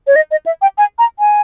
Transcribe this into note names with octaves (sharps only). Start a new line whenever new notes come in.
C#5
D#5
D#5
E5
G5
G#5
A#5
G#5